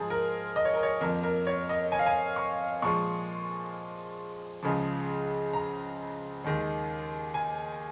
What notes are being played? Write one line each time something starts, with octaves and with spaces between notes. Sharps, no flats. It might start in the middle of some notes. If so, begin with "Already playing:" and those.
Already playing: G#2 F3 G#3 G#4 A#5
A#4
D#5
C#5
A#4
C#5
F2 F3 A#3 A#4
A#4
C#5
D#5
G#5
F5
G#5
C#6
A#2 F3 G#3 C#6
C#2 C#3 F3
A#5
D#2 D#3 G#3
G#5